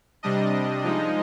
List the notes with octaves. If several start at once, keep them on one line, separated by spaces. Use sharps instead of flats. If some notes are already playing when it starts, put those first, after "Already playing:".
C3 G3 D4 D#5
F3 G#3 D#4